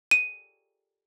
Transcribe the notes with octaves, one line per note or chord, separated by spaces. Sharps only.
D#7